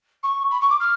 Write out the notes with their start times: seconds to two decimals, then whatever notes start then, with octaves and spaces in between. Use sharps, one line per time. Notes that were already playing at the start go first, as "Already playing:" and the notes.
0.23 C#6
0.51 B5
0.61 C#6
0.70 D6
0.80 F6